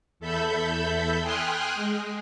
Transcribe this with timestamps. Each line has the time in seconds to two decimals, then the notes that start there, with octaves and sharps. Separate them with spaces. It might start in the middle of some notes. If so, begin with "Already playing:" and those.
0.20 E2 A4 E5 B5 G6
1.21 G5 G#5 C6 D#6 F6 F#6
1.75 G#3